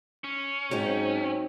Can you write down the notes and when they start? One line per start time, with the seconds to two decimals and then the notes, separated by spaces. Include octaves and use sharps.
0.24 C#4
0.71 G#2 F#3 C4 D#4